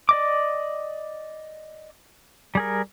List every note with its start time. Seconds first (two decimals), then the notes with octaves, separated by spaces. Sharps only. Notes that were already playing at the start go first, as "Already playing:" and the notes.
0.09 D5 D#5 D6
2.55 G3 G#4 A#4